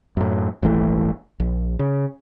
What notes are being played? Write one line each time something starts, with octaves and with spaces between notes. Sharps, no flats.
F#2 A2
D#1 G#1 E3 A3
A#1
C#3